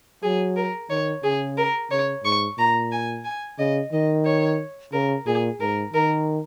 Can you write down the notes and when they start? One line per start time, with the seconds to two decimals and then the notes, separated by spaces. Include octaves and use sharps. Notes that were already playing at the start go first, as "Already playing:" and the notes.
0.23 F#3 G#4
0.56 A#4
0.90 D#3 C#5
1.23 C#3 G#4
1.57 A#4
1.91 C#3 C#5
2.24 G#2 C#6
2.58 A#2 A#5
2.92 G#5
3.25 G#5
3.59 C#3 D#5
3.93 D#3 D#5
4.25 C#5
4.93 C#3 A#4
5.26 A#2 G#4
5.61 G#2 A#4
5.94 D#3 A#4